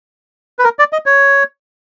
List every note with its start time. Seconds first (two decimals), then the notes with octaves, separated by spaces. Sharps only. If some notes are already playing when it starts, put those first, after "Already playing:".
0.59 B4
0.64 A#4
0.79 D5
0.93 D#5
1.06 C#5